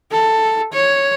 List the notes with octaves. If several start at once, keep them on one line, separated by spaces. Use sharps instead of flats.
A4
C#5